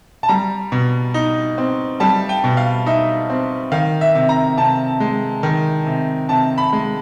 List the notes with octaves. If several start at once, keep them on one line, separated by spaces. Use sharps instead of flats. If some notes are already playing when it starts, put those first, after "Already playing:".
A5
G3 A#5
B2
D#4
C4
G3 A5
G5
B2
F5
D#4 E5
C4
D#3 F5
E5
C3
A#5
C3 A5
G#3
D#3
C3
C3 A5
B5
G#3